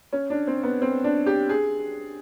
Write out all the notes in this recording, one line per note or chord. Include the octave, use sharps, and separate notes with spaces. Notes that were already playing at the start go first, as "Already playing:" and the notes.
C#4
D4
C4
B3
C4
D4
G4
G#4